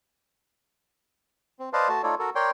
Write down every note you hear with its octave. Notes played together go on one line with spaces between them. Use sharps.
C4
B4 C5 D5 D#5 F5 A5
A3 F#4 A5
A3 D#4 F4 A4 C#5 D5
F#4 A4 A#4
A#4 C#5 D5 G5 C6